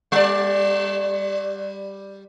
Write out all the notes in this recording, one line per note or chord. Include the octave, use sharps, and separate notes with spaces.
G3 D5